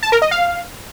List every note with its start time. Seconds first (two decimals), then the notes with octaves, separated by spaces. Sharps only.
0.03 A5
0.12 A#4
0.22 D#5
0.31 F5